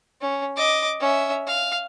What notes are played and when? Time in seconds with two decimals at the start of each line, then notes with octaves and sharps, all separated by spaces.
0.21 C#4
0.57 D#5 D6
1.00 C#4 E5
1.47 F5